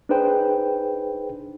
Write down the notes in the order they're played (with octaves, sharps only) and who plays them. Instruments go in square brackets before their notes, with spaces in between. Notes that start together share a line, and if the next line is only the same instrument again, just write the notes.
[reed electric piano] D4 D#4 G#4 B4 C5 G5